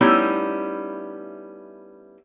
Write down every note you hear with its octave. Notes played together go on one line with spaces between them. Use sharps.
G3 A3 B3 C#4 D#4 E4